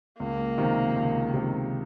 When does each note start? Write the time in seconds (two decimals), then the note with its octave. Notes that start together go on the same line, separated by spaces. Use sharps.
0.20 C#2 A#3
0.58 C3 D#3
0.96 C#2
1.33 C3 D#3